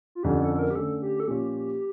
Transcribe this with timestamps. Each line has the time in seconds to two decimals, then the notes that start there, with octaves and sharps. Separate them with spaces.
0.15 F4
0.23 F2 D3 F3 C#4 G4
0.42 A4
0.54 A4
0.59 A#4
0.71 G4
0.76 D3 A3 C#4 A4
1.02 G4
1.20 A4
1.27 A#2 F3 C#4 F4 G4 C#5